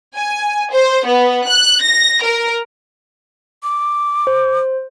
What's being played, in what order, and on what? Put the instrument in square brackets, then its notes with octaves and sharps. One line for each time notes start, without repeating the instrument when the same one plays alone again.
[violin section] G#5
C5
B3
F#6
A#6
A#4
[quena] D6
[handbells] C5